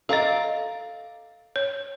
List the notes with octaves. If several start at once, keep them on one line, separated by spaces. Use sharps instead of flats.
A4 D#5 F5 A#5 D6
C#5